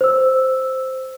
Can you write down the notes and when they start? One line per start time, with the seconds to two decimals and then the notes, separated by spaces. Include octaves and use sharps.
0.01 C5 E6